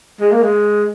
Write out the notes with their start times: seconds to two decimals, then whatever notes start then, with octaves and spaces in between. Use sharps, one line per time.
0.20 G#3
0.32 A#3
0.43 G#3